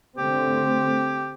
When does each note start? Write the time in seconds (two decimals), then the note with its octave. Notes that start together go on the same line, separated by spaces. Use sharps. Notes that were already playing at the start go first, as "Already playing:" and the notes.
0.17 D3 A3 C4 G4